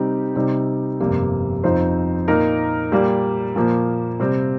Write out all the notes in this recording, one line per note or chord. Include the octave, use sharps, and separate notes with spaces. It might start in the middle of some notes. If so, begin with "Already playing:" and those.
Already playing: C3 G3 C4 D#4 G4
C3 G3 C4 D#4
G1 F2 C3 G3 A#3
F2 F3 C4 D#4 C5
A#2 A#3 D#4 A#4
A#2 G3 A#3 G4
A#2 F3 A#3
C3 G3 C4